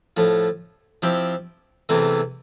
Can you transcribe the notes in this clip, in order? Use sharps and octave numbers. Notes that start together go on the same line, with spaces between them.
A2 F3 A3
F3 C4 E4 G4
E2 C3 E3 A3 C4